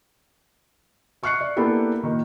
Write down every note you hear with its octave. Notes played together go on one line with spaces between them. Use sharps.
E5 C#6 F6 F#6 C7 C#7
D5
A#3 B3 D4 E4 G4 A4
A#2 D#3